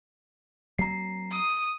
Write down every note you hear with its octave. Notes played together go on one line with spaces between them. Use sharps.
F#3 A#3 C4 A#5 C7
D#6